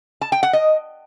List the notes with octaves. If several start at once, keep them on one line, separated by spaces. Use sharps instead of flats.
A5
G5
F#5
D#5